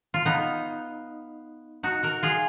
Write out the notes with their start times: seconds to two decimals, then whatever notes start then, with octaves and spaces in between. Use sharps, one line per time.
0.14 F4
0.25 B3 D#4
1.83 D#4 F#4
2.03 F#4 A#4
2.23 F4 G#4